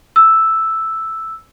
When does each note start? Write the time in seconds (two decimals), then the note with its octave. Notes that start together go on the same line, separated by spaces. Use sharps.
0.16 E6